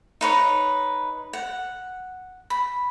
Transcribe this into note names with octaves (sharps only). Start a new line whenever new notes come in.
D#4 B4 C#5
F#5
B5